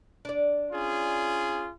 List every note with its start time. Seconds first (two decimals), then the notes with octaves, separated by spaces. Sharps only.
0.25 D4 D5
0.72 C#4 F4 G#4